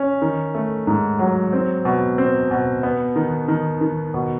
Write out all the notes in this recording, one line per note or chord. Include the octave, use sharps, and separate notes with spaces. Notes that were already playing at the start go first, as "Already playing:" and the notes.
Already playing: C#4
D#3
A3
G#2
F#3
C4
B2
C4
B2
B3
D#3
D#3
D#3
B2